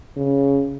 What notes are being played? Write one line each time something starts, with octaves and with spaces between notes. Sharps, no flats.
C#3